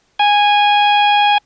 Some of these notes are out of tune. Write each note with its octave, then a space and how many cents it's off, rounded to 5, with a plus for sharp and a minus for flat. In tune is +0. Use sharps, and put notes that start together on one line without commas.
G#5 -10